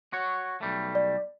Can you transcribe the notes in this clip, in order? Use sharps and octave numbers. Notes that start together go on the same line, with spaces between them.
F#4 C#5
B1 G3 A3
D5